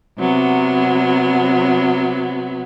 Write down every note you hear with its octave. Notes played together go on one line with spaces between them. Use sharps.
C3 F#3 B3